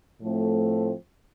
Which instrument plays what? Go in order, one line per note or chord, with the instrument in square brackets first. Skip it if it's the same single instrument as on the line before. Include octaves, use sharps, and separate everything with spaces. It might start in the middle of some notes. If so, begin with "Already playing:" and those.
[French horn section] A2 F3 A3 C4